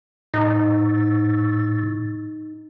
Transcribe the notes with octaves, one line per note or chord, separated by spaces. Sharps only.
A2 D#4